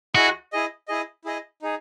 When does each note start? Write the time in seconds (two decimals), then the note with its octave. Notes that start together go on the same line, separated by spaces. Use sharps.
0.15 E4 F#4 G#4 D#5
0.53 E4 G#4 D#5
0.88 E4 G#4 D#5
1.25 E4 G#4 D#5
1.62 D#4 G#4